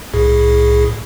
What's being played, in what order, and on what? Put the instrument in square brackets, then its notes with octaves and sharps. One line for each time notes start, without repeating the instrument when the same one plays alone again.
[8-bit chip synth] C2 A2 G#4